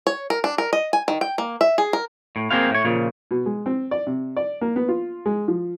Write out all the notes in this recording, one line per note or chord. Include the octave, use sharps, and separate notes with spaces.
C#5
A#4
D4
A#4
D#5
G#5
D#3
G5
A#3
E5
G#4
A#4
A2
A#3 C4 G#4 C5 F5
A2 C#5
A#2 C#3 F3
B2
G#3
C4
D5
C3
D5
A#3
B3
F4
G#3
F3